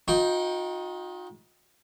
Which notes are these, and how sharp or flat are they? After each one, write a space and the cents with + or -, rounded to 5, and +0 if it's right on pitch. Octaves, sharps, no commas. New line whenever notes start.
D#4 +20 F#4 -45 G5 +0